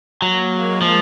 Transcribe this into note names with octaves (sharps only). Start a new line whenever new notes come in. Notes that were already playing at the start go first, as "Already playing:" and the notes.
F#3 A#3
G#3
F3